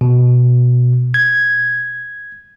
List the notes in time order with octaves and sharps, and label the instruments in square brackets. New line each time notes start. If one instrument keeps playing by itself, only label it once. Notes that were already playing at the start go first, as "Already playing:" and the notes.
[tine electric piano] B2
G#6